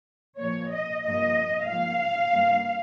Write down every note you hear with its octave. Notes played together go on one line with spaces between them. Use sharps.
A#2 F3 A#3 C#5
D#5
G2 F3 A#3 D#5
G#2 F3 A#3 F5
G2 G3 A#3